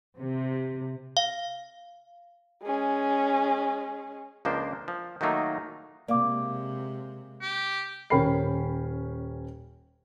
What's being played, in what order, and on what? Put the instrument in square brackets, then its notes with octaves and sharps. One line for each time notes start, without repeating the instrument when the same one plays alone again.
[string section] C3
[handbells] F5
[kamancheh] G#3 C#4
[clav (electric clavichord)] C#2 F3 A#3 D4 C5
F3
D#3 F#3 A3 A#3 D#4
[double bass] C3 G#3 [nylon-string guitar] A#3 [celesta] D5 F5 D6
[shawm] G4
[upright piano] D#1 C#4 A#4 G5 B5 C7